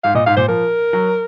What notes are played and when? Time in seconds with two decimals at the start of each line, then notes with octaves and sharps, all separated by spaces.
0.04 G#2 F5
0.15 A#2 D#5
0.26 G#2 F5
0.37 A#2 C5
0.48 F3 A#4
0.93 F#3